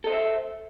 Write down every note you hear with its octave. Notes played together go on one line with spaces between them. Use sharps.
A4 C5 D#5 E5